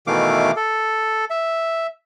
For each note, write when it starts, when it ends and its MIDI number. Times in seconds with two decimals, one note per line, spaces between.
0.07 0.51 47
0.07 0.51 51
0.07 0.51 52
0.07 0.51 57
0.07 0.51 77
0.07 0.51 86
0.56 1.25 69
1.30 1.87 76